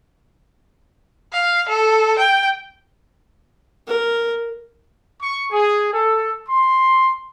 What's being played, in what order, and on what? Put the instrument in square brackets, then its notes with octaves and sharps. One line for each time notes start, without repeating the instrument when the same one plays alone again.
[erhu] F5
A4
G5
[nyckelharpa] A#4
[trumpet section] C#6
G#4
A4
C6